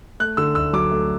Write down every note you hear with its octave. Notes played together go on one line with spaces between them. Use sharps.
A3 F#6
D3 E6
D2 E6
F#3 D6
A3